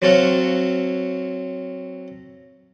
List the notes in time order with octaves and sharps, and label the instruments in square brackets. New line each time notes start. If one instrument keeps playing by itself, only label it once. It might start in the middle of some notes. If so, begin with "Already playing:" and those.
[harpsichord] F#3 C4 A4 C#5 F5 F#5